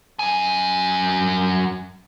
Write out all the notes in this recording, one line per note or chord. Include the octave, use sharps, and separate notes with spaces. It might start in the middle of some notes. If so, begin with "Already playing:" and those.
F#2 G#5